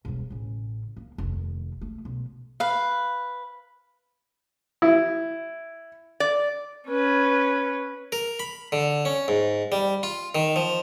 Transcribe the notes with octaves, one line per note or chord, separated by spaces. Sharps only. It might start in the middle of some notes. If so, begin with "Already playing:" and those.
E1 G2
A1 C#3
A#3
F1 D#2
A3
B1
B4 F5
E4
D5
C#4 B4
A#4
B5
D3
C#4
G#2
G3
F4
D#3
F3